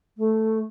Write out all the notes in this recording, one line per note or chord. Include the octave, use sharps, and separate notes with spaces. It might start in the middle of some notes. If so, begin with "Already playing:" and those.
A3